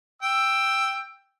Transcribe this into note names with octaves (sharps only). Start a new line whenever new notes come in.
G5 E6